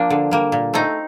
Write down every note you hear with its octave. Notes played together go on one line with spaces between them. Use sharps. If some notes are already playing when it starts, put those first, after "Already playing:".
Already playing: F3 A#3 D4
D3
G3 A#3
A#2
A3 C4 D#4